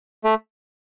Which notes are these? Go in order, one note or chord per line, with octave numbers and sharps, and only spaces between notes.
A3